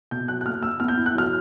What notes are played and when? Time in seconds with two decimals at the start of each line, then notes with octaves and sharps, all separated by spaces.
0.11 B2 G6
0.28 F#3 F#6
0.41 F#6
0.46 A#3 F6
0.63 A#3 E6
0.80 B3 F6
0.88 G6
0.97 E4
1.06 F#6
1.15 F#3 F6